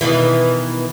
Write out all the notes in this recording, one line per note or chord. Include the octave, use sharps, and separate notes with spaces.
B2 D#3 E3